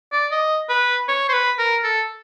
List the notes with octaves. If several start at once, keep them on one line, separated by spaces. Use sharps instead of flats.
D5
D#5
B4
C#5
C5
B4
A#4
A4